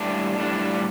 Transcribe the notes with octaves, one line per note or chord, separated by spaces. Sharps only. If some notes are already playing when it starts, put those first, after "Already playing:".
Already playing: A2 G3 D4
A2 G3 D4